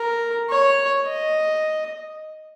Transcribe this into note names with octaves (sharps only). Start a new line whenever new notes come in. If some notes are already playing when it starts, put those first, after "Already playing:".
Already playing: A#4
C#5
D#5